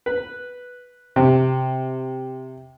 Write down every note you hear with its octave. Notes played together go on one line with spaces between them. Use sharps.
B4
C3